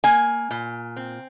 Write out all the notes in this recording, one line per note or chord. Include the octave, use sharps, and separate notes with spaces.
A#3 G#5
A#2
C4